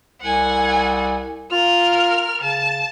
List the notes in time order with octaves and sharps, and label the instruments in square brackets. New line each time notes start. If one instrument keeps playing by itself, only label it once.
[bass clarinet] C2 [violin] F#5 G#5
[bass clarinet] F4 [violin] A#4 F6
[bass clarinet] C#3 [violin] A5